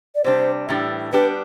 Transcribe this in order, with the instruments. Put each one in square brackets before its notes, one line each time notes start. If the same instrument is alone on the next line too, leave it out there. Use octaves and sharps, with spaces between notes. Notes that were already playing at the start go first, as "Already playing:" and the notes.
[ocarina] D5
[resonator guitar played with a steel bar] C3 G3 D4 [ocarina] C5
[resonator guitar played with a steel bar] A2 E3 G3 D4
[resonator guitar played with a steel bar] G3 B3 D4 G4 [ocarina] B4